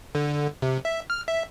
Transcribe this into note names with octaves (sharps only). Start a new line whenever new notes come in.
D3
C3
E5
F6
E5